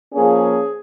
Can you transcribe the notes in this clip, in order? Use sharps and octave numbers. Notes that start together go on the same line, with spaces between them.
F3 A#3 C#4 G#4